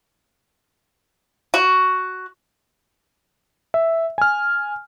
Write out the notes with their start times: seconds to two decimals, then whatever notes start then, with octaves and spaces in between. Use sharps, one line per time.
1.54 F#4
3.74 E5
4.18 G#5 F6